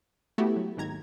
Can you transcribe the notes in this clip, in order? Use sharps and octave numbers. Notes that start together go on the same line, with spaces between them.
A3 B3 E4 F#4 G4
F#3
G#1 D#2 A#5 G#6